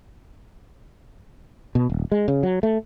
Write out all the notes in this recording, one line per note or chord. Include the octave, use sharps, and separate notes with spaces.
B2
D#1
G#3
C#3
F#3
A3